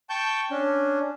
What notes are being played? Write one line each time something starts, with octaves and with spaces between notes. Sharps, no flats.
G5 A5 C#6 G6
C#4 D4